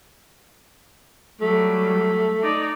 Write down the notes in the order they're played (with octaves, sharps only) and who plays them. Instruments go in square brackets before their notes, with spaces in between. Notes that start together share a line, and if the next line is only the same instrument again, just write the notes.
[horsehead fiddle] F#3 G3 [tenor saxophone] A3
[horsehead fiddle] D#4 D5